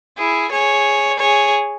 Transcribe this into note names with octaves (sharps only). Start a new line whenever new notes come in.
E4 G#4
G#4 C#5
G#4 C#5